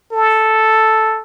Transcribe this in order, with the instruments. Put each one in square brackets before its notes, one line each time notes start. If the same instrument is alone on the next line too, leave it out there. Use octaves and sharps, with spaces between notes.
[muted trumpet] A4